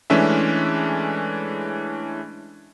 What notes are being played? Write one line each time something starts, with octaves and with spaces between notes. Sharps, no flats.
E3 G#3 A3 C#4 D4 E5